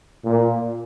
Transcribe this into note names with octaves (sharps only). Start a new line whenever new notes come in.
A#2